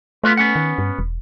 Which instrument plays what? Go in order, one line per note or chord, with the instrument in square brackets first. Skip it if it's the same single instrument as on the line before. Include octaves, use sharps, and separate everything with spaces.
[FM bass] A3 [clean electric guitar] B3 F4 B4
[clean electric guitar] B3 C#4 F#5
[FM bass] D#3
G2
E1